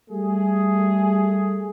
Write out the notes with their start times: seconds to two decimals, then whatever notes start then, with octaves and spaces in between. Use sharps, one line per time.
0.10 G3 A3 G#4